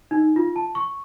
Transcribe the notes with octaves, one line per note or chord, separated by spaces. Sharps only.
D#4
F4
A5
C#6